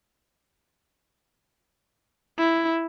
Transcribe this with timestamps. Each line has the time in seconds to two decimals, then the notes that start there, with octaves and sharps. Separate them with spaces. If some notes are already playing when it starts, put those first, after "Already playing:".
2.38 E4